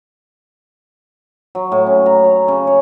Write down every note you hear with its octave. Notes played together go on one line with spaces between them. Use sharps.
F#3
A2
C#4
A#5
C#5
C#3
C#5